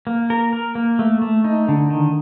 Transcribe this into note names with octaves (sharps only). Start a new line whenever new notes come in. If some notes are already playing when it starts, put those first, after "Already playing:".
A#3
A#4
A#4
A#3
A3
A3
D#4
D3
D#3